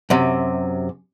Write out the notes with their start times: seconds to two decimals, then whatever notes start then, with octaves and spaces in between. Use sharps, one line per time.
0.10 F#2 C3